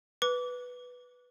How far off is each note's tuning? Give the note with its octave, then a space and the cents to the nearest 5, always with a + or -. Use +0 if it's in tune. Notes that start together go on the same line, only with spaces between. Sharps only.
B4 +0 D6 -25